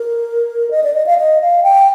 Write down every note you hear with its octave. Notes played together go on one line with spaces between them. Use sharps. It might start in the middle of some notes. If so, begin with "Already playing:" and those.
Already playing: A#4
D#5
D5
D#5
F5
D#5
F5
G5